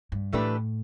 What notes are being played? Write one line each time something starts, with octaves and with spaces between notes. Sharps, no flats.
G2
A2 E3 A3 D4 G4 B4